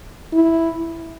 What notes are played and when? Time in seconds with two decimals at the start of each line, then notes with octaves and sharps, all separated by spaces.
0.33 E4